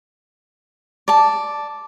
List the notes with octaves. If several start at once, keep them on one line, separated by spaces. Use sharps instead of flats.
D5 A5